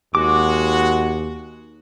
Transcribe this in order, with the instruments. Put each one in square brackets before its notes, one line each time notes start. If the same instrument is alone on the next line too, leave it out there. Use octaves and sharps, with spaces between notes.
[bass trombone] D#2 [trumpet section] G#3 F#4 [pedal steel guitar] D6